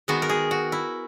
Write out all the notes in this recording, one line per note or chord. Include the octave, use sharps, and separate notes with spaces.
D#3 G#3 B3 F#4
A#4
G#4
F#4
E4